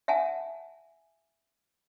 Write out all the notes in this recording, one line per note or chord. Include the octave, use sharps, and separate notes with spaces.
E5 F#5 G#5 A5